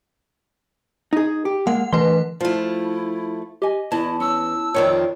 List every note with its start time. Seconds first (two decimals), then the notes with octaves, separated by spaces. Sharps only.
1.13 D#4 G#4
1.45 G4
1.67 G#3 A#3 F#5
1.93 E3 A3 B4 C6
2.41 F3 A3 E4 F4
3.62 G4 D#5 G#5
3.92 E2 E4 A5
4.20 C#4 E6
4.74 F2 D#3 F4 C#5 D5